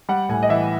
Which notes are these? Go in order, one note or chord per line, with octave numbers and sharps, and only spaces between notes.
G3 F#5
A2 G#5
D#5
E3 E5